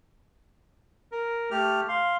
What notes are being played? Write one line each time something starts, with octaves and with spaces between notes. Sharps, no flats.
A#4
A3 G4 F6
F5 C6